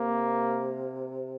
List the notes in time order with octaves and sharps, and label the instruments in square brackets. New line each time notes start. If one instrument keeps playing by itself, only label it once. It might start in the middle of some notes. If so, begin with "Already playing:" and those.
Already playing: [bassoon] C3 [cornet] A#3